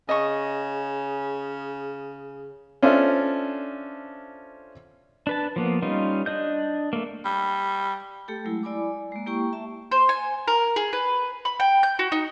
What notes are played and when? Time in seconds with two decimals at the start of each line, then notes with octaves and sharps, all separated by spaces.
0.09 C#3 G#4 D#5 C#6
2.83 C#4 D4 F4 A4 C5 E5
5.27 D4 B4 A5
5.56 F3 A#3 B3
5.82 G3 C#4 D#4 F4
6.26 D4 D#5 G6
6.93 A3 A#3
7.25 G3
8.28 A3 G4 A4 G5
8.45 F#3 G#3 A3 E4
8.63 E4 D5 G#5 B5 D6
9.12 G#3 A#3
9.26 A#3 E4 G4 G5 C#6
9.53 E5 A5
9.92 C5
10.09 G#5
10.48 A#4
10.76 G#4
10.93 B4
11.45 B5
11.60 G5
11.83 G6
11.99 F#4
12.12 D#4